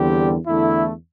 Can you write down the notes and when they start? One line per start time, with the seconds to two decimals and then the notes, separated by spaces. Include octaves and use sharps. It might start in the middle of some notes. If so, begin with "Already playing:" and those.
Already playing: E2 D3 G3 C4 G4
0.46 E2 D3 A3 E4